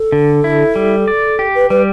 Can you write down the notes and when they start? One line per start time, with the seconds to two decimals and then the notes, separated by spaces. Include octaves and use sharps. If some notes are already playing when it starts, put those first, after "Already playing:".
Already playing: A4
0.12 D3
0.44 E4
0.76 G3
1.08 D5
1.39 G4
1.55 B4
1.70 G3 B4